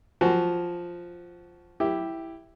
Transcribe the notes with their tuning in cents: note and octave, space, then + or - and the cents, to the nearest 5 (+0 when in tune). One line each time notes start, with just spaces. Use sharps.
F3 +0 F#4 +15 G#5 +0
E4 +0 G4 +0